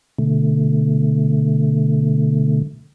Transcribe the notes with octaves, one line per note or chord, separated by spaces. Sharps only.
B2 D3 A3